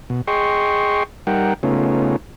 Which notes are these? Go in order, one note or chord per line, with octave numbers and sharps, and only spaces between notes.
B2
G#4 D#5 G5 C6 C#6
G3 D#4 A#4 F#5 G5
C#3 A3 B3 C#4 D#4 F4